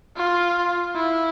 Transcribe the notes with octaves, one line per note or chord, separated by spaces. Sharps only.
F4
E4